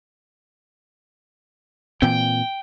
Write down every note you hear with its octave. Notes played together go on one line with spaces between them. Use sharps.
A#2 E3 C4 G5